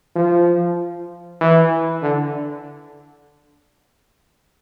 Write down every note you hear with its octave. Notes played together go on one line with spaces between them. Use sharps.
F3
E3
D3